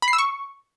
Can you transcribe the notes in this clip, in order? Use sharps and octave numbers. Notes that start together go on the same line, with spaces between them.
B5
C7
E6
C#6